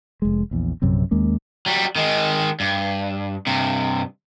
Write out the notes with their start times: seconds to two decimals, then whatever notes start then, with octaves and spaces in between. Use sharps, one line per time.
0.22 F1 G#3
0.51 A#1 E2
0.82 A#1 F#2 C3 C4
1.11 D#2 G#3 A#3 C#4
1.66 F#3 G3
1.96 D#3 G#3
2.60 G2
3.47 G2 C3